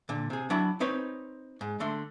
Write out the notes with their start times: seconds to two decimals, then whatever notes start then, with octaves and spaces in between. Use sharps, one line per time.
0.09 A#2 D3
0.30 C3 G#4
0.50 F#3 D4 E4 B5
0.80 C4 D#4 B4 C#5
1.61 G#2
1.80 D3 A3 C6